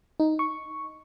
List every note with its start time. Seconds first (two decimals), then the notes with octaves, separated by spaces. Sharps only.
0.20 D#4
0.39 C#6